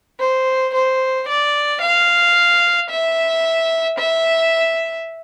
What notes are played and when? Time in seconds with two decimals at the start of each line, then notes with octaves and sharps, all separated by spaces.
0.20 C5
0.74 C5
1.28 D5
1.82 F5
2.90 E5
3.98 E5